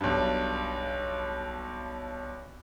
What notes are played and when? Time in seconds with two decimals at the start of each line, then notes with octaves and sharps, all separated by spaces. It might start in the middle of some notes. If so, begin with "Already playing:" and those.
0.01 B1 G2